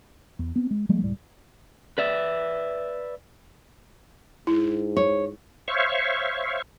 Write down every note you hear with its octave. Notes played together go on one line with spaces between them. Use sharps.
E2
B3 C4
G#3
F3 G3 G#3 A#3
F#1 C#2 A2 G3
B4 D5 E5
G#2 E4
C#5
C5 C#5 E5 F5 C#6